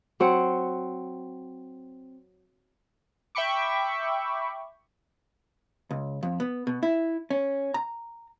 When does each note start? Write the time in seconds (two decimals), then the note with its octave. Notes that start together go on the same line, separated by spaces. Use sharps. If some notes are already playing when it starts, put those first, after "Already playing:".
0.20 F#3 C4 F#5
3.35 E5 G5 B5 C#6 D6
5.91 C#2
6.23 F2
6.40 B3
6.67 B2
6.83 E4
7.30 C#4
7.74 A#5